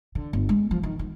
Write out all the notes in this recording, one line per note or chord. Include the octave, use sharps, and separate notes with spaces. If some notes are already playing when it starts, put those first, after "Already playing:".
D3
G1
G#3
F3
D#3
D#3